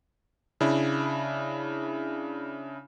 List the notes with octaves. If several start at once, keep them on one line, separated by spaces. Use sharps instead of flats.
C#3 D4 E4